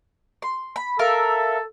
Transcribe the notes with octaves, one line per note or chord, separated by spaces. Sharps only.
C6
B5
A4 A#4 E5 F5